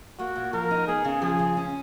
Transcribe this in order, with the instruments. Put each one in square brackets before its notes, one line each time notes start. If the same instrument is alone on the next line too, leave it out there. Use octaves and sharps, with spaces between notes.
[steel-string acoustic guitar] A#3 [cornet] F#4
[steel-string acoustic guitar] A#2
[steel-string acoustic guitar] F3 [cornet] A#4
[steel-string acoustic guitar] D#4
[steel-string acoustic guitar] B3 [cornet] G#4
[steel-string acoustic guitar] C#3
[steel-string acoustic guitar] F3 [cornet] G#4
[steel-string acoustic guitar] C#3
C#4